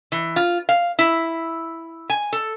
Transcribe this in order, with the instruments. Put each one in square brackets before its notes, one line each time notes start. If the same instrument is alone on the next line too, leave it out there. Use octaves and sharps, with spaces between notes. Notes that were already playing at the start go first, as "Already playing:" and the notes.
[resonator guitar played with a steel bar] E3
F4
F5
E4
G#5
A4